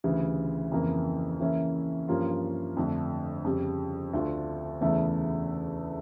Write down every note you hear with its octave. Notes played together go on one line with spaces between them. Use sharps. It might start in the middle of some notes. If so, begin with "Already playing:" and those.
D2 C#3 E3 G3
F2 C#3 E3 A#3
C#3 E3 A#3 C#4 E4
G2 F3 A#3 C#4 F4
F2 D3 A3 D4
F2 C#3 G3
D2 D3 A3 D4 F4
E2 C#3 E3 A3 E4